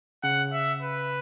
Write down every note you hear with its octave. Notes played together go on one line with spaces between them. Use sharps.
C#3 F#5
E5
B4